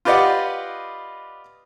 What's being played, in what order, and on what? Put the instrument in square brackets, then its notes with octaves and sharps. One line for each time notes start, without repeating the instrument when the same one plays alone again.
[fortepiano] F4 G4 B4 D5 D#5 F#5